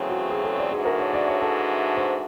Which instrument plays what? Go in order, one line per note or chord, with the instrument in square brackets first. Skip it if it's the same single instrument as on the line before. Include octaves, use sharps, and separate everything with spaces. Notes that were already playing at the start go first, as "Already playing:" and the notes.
Already playing: [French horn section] E2 C#3 F#3 A3 C4
[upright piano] F#4
G#4
A4
D5
[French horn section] G#2 E3 A3 D4 F#4 [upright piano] G#4
[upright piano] A#4
C#5
D5
C#5
A4
C5